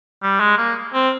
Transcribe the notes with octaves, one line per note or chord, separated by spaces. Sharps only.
G3
G#3
A#3
C4